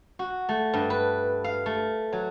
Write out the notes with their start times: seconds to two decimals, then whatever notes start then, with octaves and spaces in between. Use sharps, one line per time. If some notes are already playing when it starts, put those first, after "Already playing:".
0.19 F#4
0.49 A3
0.73 G2
0.90 B4
1.44 F5
1.66 A3
2.13 F#3